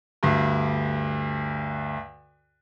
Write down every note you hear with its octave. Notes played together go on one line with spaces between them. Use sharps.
D2 G2